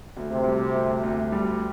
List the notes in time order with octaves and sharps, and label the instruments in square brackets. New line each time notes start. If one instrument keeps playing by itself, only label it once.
[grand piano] D2
[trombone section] C3
[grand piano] G3
D2
D2
G3